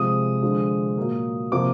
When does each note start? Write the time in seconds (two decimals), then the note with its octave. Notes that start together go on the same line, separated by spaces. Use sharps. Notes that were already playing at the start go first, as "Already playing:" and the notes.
Already playing: C3 F3 G#3 D#6
0.42 D3 F3 G#3
0.97 A#2 F#3 A#3
1.52 C3 F3 A#3 D6